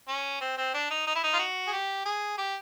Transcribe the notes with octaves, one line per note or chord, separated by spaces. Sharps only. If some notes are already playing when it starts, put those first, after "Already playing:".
C#4
C4
C4
D4
D#4
D#4
E4
D#4
F4
F#4
G#4
G4
G#4
G4